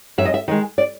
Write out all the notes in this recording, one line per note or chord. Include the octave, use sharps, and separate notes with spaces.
F#2 E5
D#5
E5
D#3 G#3 D#5
D5